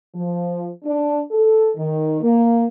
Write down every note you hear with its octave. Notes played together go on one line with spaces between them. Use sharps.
F3
D4
A4
D#3
A#3